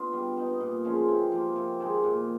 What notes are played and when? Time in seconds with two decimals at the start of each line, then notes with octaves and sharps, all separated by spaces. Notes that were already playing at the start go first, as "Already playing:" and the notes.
Already playing: B3 D4 F4
0.13 G3
0.37 B3 D#4
0.60 A#2
0.84 F3 G#3 C#4
1.08 C3
1.32 F3 A#3
1.56 C3
1.80 D#3 G#3
2.03 A#2